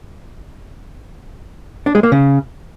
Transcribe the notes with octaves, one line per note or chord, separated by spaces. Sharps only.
D4
G#3
A#3
C#3